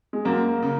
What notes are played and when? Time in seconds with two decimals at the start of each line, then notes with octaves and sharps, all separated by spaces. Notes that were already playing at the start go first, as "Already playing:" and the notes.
0.13 G#3
0.25 F#2 A#3
0.62 C#3